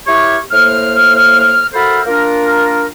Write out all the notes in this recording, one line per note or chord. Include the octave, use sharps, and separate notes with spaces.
E4 G4 A#4 C#5 C#6
A2 A#3 C5 F6
F#4 A4 A#4 C5 E5 B5
A#3 D4 F4 A#4